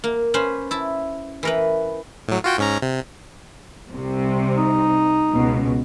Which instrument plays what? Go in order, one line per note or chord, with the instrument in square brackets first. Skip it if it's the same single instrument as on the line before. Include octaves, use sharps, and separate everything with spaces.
[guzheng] A#3
C#4 B4 C5
E4 A5
E3 A#4 B4
[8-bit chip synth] A2 F#3
F4 F#4 G5
G#2 C#4 A#5
C3
[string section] C2 C3
[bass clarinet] D#4
[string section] C#2 B2